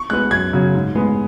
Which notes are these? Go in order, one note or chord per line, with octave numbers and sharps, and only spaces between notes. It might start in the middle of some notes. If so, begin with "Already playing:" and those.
Already playing: C#6
G#3 B3 F#6
F#2 G#6
C#3 F#3
G#2
G#3 B3